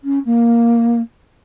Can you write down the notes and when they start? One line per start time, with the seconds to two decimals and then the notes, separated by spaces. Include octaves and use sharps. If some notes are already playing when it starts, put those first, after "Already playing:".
0.04 C#4
0.25 A#3